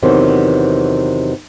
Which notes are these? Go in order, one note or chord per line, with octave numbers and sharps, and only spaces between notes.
E2 C3 D#3 E3 F#3